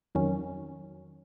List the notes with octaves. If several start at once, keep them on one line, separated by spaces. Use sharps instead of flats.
F2 D#3 F#3 C#4